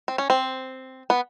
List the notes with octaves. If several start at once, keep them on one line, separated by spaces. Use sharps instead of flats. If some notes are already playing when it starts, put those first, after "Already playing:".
C4
C#4
C4
B3